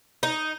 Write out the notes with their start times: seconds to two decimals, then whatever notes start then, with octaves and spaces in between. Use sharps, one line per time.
0.23 D#4